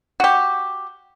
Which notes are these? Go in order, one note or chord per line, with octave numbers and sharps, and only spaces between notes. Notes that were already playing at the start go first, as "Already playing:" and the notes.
F#4 G4